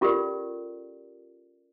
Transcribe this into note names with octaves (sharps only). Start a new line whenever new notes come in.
C#4 F4 G4 A4 A#4 D5